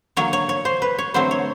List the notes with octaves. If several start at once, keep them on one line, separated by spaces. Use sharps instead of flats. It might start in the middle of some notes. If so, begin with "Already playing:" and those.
D3 F#3 A#3 C#5
C#5
C#5
C5
B4
C#5
D3 F#3 A3 C4 C5
C#5